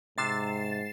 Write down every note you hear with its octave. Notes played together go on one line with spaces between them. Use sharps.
G#2 C3 A6 C7 E7